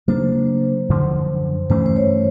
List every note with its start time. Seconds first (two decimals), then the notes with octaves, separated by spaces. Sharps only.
0.08 C#3 F#3 A#3 D4 C5
0.89 F#2 D3 F3
1.70 G2 E3 A3 C#4 C5
1.86 C5
1.96 C#5